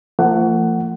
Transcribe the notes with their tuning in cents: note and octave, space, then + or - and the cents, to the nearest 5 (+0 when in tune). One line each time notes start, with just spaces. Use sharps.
F3 -30 A3 +45 F#5 +15